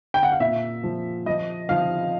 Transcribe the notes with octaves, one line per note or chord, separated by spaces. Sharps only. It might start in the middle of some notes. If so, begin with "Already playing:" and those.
G5
F#5
F5
A#2 E5
F3
F3 D#5
F3 F5